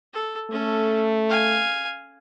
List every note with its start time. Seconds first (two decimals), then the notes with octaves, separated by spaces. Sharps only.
0.13 A4
0.51 A3 C#4 A4
1.29 F5 G#5